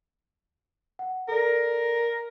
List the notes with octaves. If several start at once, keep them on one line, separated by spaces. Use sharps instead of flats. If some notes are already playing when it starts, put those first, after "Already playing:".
F#5
A4 A#4 D5